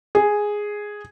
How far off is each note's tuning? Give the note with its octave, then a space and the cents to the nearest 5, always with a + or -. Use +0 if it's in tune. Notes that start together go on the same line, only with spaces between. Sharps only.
G#4 +0